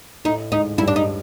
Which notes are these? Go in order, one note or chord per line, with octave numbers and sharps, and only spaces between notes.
A2 A3 D#4
G#2 G#3 D#4
G2 G3 E4
D4
D#4